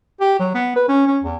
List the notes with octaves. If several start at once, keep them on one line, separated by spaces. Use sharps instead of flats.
G4
F#3
B3
B4
C#4
C#4
E2